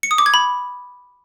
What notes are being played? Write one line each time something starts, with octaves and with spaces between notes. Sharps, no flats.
C#7
D#6
D6
G#6
B5